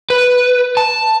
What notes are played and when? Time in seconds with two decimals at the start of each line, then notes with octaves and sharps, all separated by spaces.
0.10 B4
0.77 A5